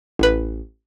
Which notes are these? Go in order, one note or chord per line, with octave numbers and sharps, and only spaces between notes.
A1 B4